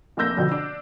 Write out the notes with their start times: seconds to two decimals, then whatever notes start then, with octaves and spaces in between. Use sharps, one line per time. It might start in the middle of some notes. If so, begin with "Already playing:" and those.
0.17 F1 A#3 D4 E6 G6 A#6
0.37 F2 B2 D3 F3
0.52 D4